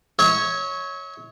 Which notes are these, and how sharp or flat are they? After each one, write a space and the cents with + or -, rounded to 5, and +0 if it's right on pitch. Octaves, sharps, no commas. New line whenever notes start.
C#5 +0 E5 -45